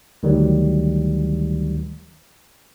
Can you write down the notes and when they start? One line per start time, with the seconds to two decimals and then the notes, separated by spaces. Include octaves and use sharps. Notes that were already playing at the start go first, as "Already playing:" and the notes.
0.23 D2 D#3 F#3 G3